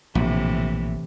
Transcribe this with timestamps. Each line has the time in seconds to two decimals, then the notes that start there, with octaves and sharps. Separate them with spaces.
0.15 A#1 A2 C3 E3